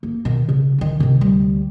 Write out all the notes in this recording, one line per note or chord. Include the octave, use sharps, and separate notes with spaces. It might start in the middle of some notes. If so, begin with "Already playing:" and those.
A#3
B2 D#3
C#3
D3 D#3
C3 D#3
D2 G3